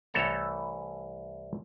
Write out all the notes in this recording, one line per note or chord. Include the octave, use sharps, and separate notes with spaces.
C2 E3 A3 A4 C#5 A#5